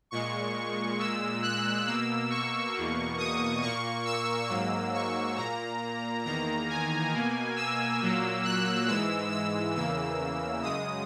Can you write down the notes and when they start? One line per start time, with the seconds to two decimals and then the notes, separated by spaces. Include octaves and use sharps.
0.11 A#2 G#3 C#6
0.99 A#2 G#3 E6
1.42 F#6
1.87 B2 A#3 E6
2.30 C#6
2.74 E2 B2 A#3
3.18 D#6
3.61 A#2 A#3 C#6
4.05 E6
4.49 G#2 F#3 A#3 E6
4.94 C#6
5.37 A#2 A#3 A#5
6.24 E2 D#3 A#3 A#5
6.69 G#5
7.12 B2 A#3
7.56 E6
8.00 A#2 F#3 A#3
8.44 F#6
8.87 G#2 E3 G#3 E6
9.31 E6
9.76 E2 C#3 E3 A#3 E6
10.63 F#2 C#3 G#3 D#6